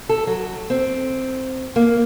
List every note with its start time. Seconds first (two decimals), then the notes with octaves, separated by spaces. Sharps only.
0.09 A4
0.27 F#3
0.70 C4
1.76 A#3